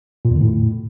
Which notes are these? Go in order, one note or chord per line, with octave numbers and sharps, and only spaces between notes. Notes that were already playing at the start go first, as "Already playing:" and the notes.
A#2
E2
D3
A2